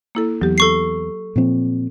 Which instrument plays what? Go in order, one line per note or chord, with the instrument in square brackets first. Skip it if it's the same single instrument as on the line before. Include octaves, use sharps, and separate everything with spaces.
[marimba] A#3 E4 A4
[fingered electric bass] E2 [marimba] F#3 G4
[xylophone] A4 C#6 C7
[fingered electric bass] A#2 F3 C4